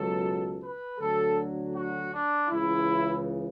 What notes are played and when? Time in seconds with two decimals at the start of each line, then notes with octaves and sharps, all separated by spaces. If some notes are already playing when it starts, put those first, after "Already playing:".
Already playing: C#2 B2 F#3 A4
0.61 B4
0.98 D2 D3 F#3 A4
1.74 F#4
2.11 D4
2.48 C#2 C#3 E3 E4